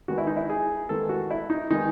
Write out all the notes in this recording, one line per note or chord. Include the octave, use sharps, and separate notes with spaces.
D#3 G#3 B3 F#4
E4
D#4
E4
G#4
D#3 G#3 B3 A4
F#4
E4
D#4
D#3 G#3 B3 D#4